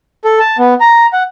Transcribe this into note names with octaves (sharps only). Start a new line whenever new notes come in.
A4
A5
B3
A#5
F#5